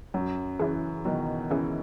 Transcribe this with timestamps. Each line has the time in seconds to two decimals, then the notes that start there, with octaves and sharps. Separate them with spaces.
0.14 F#2 F#3
0.59 C#3 E3 C#4 E4 G#4
1.05 B2 D#3 F#3
1.50 C#3 E3 C#4 E4 G#4